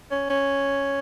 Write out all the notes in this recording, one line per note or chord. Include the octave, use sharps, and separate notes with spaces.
C#4
C#4